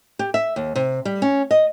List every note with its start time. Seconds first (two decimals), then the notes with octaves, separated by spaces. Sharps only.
0.19 G4
0.34 E5
0.56 D#2
0.75 C3
1.05 G3
1.22 C#4
1.51 D#5